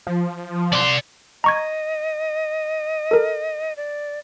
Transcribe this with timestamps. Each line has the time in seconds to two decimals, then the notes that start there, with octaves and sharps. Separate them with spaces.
0.07 F3
0.72 D5 C6
1.44 D#5 A#5 C#6 G#6
3.11 A4 A#4
3.77 D5